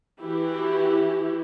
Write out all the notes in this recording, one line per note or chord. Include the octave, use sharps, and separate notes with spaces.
E3 E4 F#4 G4